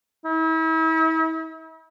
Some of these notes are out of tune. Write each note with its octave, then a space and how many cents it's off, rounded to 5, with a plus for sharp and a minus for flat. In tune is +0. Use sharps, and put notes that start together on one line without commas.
E4 -40